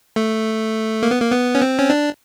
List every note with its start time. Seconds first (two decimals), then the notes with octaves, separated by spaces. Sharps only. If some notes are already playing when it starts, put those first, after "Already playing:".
0.16 A3
1.03 A#3
1.11 B3
1.20 A#3
1.32 B3
1.55 C#4
1.62 C4
1.79 C#4
1.90 D4